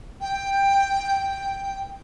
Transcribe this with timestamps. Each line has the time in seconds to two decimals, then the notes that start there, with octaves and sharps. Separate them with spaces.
0.21 G5